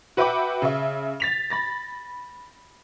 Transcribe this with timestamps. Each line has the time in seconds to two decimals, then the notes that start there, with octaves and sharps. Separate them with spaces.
0.17 F#4 B4 E5 G5 B5 D6
0.62 C#3 E5
1.20 A6 B6 F7
1.50 B5 A6 A#6